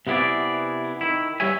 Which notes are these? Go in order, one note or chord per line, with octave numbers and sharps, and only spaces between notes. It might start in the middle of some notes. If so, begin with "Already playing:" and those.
C3 B3 E4 G#4 D5
D#3 E4
G2 G3 G#4 C#5 E5 G#5